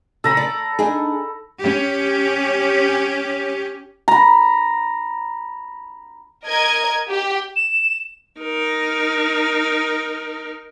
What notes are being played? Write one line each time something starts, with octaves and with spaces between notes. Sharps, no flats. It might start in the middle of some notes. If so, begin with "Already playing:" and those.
C#3 A4 A#5 B5
D5
D4 D#4 G#4
C#4 G4
A#5 B5
A#4 D#5 A#5 G#6
G4
E7
D#4 A#4